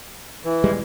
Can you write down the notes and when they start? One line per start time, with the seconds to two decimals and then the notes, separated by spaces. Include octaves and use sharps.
0.44 E3
0.64 D#1 G3 G#3